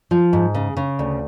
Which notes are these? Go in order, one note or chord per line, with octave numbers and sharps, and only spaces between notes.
F3
G#2
C#3
C#3
D2